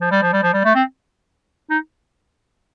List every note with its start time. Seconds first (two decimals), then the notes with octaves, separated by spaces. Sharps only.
0.01 F3
0.11 G3
0.22 F3
0.32 G3
0.43 F3
0.54 G3
0.65 A3
0.75 C4
1.70 D#4